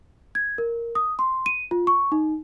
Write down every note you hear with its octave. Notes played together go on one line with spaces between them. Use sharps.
G#6
A#4
D#6
C6
D#7
F4
C#6
D#4